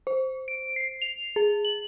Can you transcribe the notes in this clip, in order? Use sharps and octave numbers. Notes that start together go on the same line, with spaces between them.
C5
D7
C7
F7
G#4
F#7